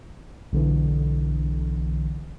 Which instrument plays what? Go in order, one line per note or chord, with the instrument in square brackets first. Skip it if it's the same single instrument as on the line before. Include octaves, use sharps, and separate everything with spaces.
[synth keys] B1 D3 E3